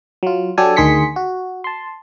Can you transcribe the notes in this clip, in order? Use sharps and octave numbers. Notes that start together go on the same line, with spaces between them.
F#3 F4
F#3 D4 G4 A4 G#5
D2 D#3 G#4 C6 B6 C#7
F#4
A5 C6